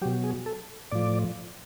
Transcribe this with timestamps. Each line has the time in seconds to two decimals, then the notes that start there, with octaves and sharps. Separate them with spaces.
0.02 F#3 G4
0.05 B2
0.24 G#4
0.46 A4
0.92 A2 F3 D5